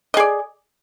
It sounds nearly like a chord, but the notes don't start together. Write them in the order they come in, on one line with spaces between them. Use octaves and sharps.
D#5 G#4 D5